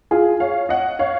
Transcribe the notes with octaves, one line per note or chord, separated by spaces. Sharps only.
F4 G#4
C#5 F5
D#5 F#5
C#5 F5